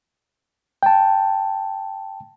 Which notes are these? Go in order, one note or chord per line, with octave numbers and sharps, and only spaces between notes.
G5 A5